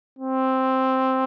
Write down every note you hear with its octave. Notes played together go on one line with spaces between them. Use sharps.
C4